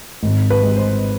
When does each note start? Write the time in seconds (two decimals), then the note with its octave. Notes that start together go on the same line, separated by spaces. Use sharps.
0.23 G#1
0.50 B4
0.63 G#3
0.77 C5